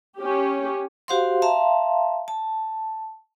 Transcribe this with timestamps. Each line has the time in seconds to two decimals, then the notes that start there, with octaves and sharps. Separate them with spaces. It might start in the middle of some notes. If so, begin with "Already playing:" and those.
0.19 C#4 G4
1.08 F#4 G4 C5 F5 F#5 C6
1.42 E5 F5 A5 A#5 C6
2.28 A5